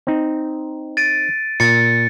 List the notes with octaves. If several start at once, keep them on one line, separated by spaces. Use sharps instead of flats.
C4 D#4
A6 D7 D#7
A#2 A6 C#7